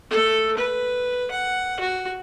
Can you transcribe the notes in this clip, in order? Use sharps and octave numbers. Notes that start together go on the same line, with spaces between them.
A3 A4
B4
F#5
F#4